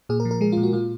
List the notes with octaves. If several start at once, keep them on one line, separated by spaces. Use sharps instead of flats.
A#2 G#4
A#4
F3
A#4
G#3 G#4
F4
A#2
F#4
A#2 F4